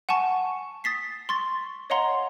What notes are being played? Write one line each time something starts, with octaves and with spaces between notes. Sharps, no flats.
F#5 G#5 A5 C#6
D#6 A6 B6 C7
C6 C#6 A6
C#5 D#5 F5 F#5 A#5 C6